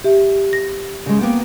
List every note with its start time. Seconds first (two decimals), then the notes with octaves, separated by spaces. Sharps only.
0.04 G4 E5
0.53 A#6
1.06 C#3 G#3
1.19 A#3 B3 G5